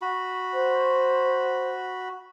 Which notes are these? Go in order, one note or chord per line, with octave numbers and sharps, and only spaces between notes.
F#4 B5
C5